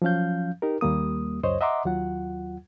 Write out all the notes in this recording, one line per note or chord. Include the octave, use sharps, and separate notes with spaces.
F3 F#3 C#4 F5 G6
D#4 G4 A#4
D#2 G3 A#3 D#6
C#2 F#2 C5 C#5 D#5
D#5 E5 F#5 A#5 C6 D6
D#2 F#3 F4 F#5